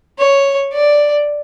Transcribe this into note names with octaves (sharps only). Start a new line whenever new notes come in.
C#5
D5